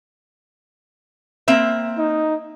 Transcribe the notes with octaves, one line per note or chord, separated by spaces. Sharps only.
A#3 C4 E5
D#4